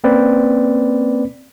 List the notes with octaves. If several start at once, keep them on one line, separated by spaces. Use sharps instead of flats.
A#3 C4 C#4 B4 D5